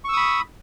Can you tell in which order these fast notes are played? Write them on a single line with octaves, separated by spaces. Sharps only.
C#6 E6 D#6 B5